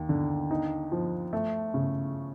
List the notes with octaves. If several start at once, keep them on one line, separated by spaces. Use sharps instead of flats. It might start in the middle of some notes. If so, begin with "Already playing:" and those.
Already playing: D#2
D3
D#4
F3
A3
C#3